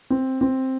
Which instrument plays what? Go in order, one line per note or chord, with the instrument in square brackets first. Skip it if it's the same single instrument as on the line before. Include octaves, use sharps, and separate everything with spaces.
[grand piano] C4
C4